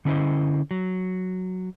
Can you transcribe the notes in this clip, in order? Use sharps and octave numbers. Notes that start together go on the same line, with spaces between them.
D3 C#4 D4 E4 C5 D#5
F#3